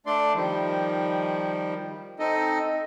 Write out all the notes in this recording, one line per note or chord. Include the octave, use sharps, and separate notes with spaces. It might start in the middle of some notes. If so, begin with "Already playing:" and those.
A3 D4 D5 C6
D#3 F3 G3
C4 D#4 A4 D#5